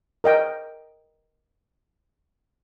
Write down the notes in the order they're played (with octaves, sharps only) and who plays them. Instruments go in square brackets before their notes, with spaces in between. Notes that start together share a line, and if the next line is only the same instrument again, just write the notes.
[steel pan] A#4 D#5 G5